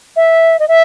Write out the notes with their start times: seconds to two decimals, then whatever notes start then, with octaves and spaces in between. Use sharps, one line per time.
0.16 E5
0.59 D#5
0.68 E5